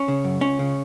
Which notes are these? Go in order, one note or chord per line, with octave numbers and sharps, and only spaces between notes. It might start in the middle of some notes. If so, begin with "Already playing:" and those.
Already playing: C#4
C#3
F#2
C#2 C#4
C#3